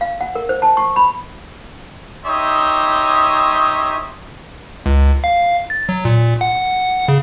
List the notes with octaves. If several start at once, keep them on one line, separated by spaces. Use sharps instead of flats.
F5
F#5
A#4
C5
A5
C#6
B5
D#4 G4 C#5 E5 C6 D#6
C#2
F5
A6
F#3
A#2
F#5
C#3